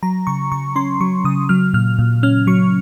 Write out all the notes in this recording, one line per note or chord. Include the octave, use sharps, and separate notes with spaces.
F#3 A#5
C#3 C#6
C#3 C#6
C#4 C6
F#3 C#6
C#3 D#6
F#3 F6
A#2 F6
A#2
C#4 F6
F#3 C#6